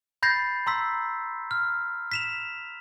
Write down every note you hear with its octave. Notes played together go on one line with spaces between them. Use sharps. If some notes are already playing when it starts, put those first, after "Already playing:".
B5 G6 A6 A#6 C7
A#5 C6 E6 B6
F6
B6 E7 F7